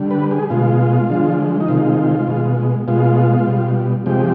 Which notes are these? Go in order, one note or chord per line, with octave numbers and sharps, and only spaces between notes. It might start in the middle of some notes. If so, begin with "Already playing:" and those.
Already playing: D3 G3
B4
G#4
B2 G#3 F4
D3 F3 G#3
D#4
C3 D#3 G#3 F4
B2 G#3
B2 G#3 F4
B2 G3
C3 F3 G#3 G4